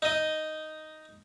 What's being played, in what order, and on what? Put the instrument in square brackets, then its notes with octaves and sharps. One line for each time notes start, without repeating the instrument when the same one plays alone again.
[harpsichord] D#4 D#5